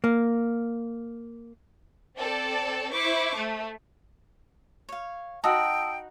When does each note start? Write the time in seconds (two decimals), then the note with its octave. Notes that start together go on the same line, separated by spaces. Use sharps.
0.04 A#3
2.16 C4 A4 D5
2.92 E4 C5 C#6 D6
3.34 A3
4.89 C#5 F5
5.44 D#4 F#4 G5 A5 B5 D#6 E6